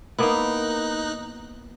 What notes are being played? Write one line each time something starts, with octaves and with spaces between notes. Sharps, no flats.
A#3 B3 D#4 E4 F#6